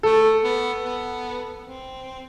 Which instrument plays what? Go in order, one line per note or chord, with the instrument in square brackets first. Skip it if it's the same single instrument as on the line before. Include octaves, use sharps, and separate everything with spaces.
[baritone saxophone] A3 [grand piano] A4
[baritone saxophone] B3
B3
C4